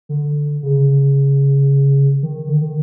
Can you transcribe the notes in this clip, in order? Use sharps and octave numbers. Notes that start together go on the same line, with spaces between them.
D3
C#3
D#3
D#3
D3
D#3